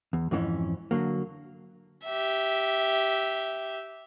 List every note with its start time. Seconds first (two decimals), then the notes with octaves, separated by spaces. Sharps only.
0.13 E2
0.31 F2 G#2 E3 C#4
0.91 D3 F#3 A#3
2.05 G4 E5